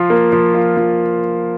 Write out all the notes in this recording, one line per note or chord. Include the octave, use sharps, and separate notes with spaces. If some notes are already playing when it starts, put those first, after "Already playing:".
Already playing: F3 F4
A#3
F3
F4
F3